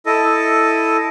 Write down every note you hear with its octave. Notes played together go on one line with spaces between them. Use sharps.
E4 A4 D#5